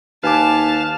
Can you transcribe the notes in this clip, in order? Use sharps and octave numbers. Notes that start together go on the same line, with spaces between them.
D#2 B4 F5 G#5 A5 D6